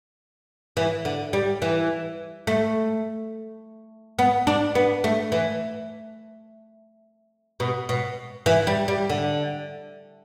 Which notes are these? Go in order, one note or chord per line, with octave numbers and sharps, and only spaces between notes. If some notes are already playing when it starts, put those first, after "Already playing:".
E3
D3
G3
E3
A3
B3
D4
B3
A3
E3
B2
B2
E3
G3
G3
D3